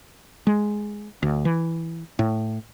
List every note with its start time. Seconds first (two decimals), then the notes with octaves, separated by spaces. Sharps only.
0.47 G#3
1.23 D2
1.45 E3
2.19 A2